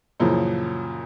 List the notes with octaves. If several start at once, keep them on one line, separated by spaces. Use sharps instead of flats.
F#2 A#2 C#3 E3 F3